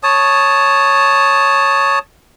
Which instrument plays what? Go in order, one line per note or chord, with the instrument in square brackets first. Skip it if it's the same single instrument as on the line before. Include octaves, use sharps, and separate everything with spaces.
[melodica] C#5 A5 D#6